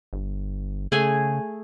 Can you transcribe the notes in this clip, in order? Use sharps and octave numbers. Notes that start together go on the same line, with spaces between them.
G1
C#3 A3 G#4 G#5